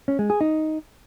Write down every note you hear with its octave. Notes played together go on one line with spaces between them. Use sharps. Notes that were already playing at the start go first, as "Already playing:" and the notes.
C#4
G#3
G#4
D#4